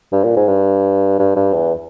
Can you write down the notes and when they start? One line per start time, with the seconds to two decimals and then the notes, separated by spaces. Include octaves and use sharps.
0.13 G2
0.24 A#2
0.36 G#2
0.48 G2
1.19 G2
1.36 G2
1.54 E2